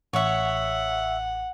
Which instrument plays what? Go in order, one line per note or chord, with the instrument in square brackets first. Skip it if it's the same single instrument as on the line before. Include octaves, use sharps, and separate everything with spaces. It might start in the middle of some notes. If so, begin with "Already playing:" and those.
[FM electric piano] A1 [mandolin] C#5 E5 [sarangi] F#5